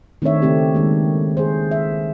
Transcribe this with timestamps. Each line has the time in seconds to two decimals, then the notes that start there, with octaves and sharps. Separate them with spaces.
0.22 D#3 A3 C4 D4 C#5 E5
0.42 C#3 A3 C4 G4
0.75 D#3 G#3 A#3
1.37 G#4 C5
1.71 E5